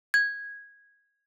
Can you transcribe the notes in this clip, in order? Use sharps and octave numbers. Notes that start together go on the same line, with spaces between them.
G#6